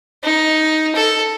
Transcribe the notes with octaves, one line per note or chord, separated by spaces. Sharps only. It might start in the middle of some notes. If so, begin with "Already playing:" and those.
D#4
A4